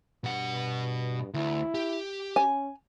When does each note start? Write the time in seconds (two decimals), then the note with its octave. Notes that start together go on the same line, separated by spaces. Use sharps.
0.24 G2 B2 F#5
1.34 D2 E4
1.75 G4
2.36 C#4 G#5